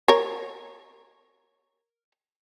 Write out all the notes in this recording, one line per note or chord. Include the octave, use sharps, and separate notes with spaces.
A#4 C#5